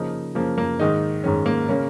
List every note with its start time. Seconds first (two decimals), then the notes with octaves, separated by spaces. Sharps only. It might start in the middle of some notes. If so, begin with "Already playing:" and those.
Already playing: C#3 F3 A#3 D#4
0.35 C#3 F3 A#3
0.58 A#3
0.79 G#2 D#3 G#3 D#4
1.24 G#2 D#3 G#3 C#4
1.46 A#3
1.69 C#3 A#3 C#4